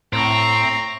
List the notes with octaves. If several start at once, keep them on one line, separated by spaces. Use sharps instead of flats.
A2 C4 A#5 C#6